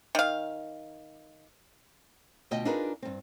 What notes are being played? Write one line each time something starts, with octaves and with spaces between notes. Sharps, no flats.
D#3 F5
D2 B2 F4 D#5 G5
D4 D#4 F4 G#4 A#4 B4
G2 C4